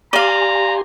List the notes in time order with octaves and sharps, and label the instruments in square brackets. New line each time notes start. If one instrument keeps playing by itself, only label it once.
[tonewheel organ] G4 G#5 C6 [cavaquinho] D5 F5 [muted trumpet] A#5